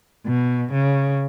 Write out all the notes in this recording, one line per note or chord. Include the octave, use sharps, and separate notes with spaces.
B2
C#3